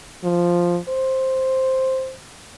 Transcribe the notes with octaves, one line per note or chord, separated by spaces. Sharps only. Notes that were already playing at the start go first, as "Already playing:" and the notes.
F3
C5